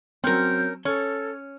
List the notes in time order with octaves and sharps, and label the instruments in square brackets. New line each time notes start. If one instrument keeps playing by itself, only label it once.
[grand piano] F#3 C4 [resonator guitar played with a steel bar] C#4 A#4 [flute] G6
[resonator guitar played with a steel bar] C#4 [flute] A4 [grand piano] C#5